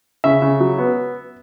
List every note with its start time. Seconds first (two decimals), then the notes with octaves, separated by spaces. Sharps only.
0.24 C#3 E5
0.42 C#3
0.60 F#3
0.78 B3